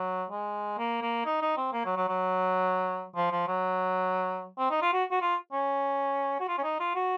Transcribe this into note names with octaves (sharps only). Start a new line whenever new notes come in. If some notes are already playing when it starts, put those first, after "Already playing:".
Already playing: F#3
G#3
A#3
A#3
D#4
D#4
C4
A#3
F#3
F#3
F#3
F3
F3
F#3
C4
D#4
F4
F#4
F#4
F4
C#4
F#4
F4
C#4
D#4
F4
F#4